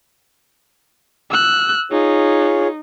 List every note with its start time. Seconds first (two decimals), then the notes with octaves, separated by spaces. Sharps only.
1.31 E6 F#6
1.92 D#4 F4 G#4 C#5